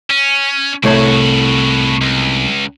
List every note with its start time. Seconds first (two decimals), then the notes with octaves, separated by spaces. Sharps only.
0.10 C#4
0.83 C2 A2 A3 F#4 C#5
2.01 C#2